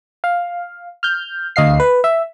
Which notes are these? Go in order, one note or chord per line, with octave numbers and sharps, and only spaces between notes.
F5
F6 G6
D2 D#5 F5 C7
B4
E5